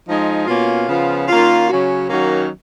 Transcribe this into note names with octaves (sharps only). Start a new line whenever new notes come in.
F3 G#3 D#4
B2 A#3 C#4 F4
C#3 F3 B3 F4
D#3 A#3 C#4 F4
C#3 F#3 C#4 F#4
D#3 F#3 A#3 C#4 F#4